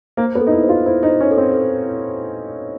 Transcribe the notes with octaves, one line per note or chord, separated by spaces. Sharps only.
A#3 C5
B3
A4
D#4
E4
C5
F4
E4 C5
D#4
C5
C#4
A4
C4
A4